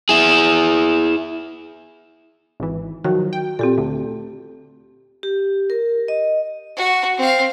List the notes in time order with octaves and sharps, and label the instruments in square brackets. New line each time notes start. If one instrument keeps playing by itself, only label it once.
[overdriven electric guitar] E4 G#4
[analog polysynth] G#1 E3
[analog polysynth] D#3 F3 F#3 [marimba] F#4
[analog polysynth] G5
[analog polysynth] A#2 [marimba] C4 G4 A4
[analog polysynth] D2 [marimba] A3
[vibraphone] G4
A#4
D#5
[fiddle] F#4
C4 F5